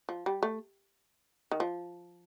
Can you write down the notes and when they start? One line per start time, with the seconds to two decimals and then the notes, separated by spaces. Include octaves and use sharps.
0.09 F3
0.26 G3
0.43 A3
1.51 D#3
1.60 F3